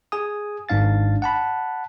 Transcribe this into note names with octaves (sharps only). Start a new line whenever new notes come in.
G#4 G#5 D#6
G#1 G#2 D4 F5 A6
F#5 A5 B5